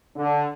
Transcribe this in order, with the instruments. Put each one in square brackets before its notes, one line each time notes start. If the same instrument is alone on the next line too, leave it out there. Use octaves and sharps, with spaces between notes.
[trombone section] D3